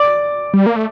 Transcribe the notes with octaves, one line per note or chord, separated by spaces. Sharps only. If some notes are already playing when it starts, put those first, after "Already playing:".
Already playing: D5 D6
G3
A#3
A3